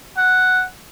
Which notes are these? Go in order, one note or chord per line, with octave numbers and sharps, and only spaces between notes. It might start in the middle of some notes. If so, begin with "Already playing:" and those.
F#5